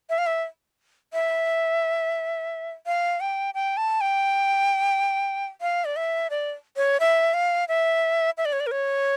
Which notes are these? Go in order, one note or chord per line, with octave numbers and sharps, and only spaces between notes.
E5
F5
E5
E5
F5
G5
G5
A5
G5
F5
D5
E5
D5
C#5
E5
F5
E5
E5
D5
C#5
D5
A#4
C#5